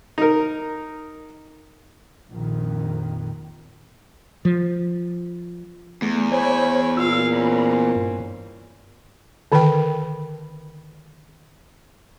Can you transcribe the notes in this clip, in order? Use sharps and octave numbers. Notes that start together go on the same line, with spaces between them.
D#4 A#4
A#1 F2 D#3
F3
E2 A3
C5 C#5 G#5 B5 C#6
A#2 F4 F5 E6
C4 C#4 A#5 B5
G2
D3 D#3 A#4 B4 G5